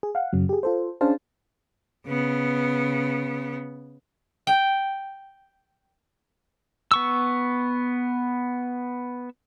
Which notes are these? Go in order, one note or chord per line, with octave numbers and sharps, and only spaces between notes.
G#4
F5 F#5
F#2 C#3 F#3
G4 G#4
F4 A4 C5
C#4 D4 G#4 C5 F5 A5
C#3 B3
G5
B3 C#6 E6